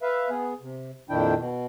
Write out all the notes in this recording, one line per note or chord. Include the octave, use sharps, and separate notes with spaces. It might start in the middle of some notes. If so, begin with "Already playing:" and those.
B4 E5 F5
B3 G#4
C3
F2 A#2 D#3 D4 E4 G5
B2